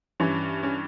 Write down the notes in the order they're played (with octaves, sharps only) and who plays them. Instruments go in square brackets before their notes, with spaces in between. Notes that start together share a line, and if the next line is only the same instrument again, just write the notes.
[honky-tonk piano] G2 E3 C#4
C#4